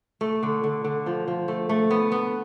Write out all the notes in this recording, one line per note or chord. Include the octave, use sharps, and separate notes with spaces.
A3
D3
D3
D3
F3
F3
A3
A3
B3
B3